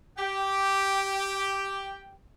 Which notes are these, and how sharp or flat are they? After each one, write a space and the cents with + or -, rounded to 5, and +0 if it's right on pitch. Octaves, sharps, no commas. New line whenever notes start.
G4 -5 G5 +0